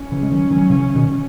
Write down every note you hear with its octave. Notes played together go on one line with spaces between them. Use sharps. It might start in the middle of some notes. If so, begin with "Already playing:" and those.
Already playing: C#4
C#3 E3
G#3
D#3 F#3
D#3 F#3
F#3
C#3 E3
B2 D#3